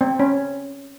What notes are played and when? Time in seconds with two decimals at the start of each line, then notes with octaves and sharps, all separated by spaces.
0.01 C4
0.19 C#4